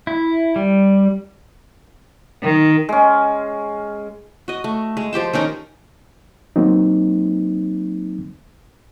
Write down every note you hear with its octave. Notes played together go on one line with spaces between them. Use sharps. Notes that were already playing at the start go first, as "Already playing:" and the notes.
E4
G3
D#3
G#3 C#4
F#4 D#5
A3
G#3
F3 G4 G5 A5
D#3 C#4 D#4 A#4
F#3 A#3 C4 D#4